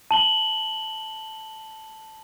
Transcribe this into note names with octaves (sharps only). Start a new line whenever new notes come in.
A5 F#7 G7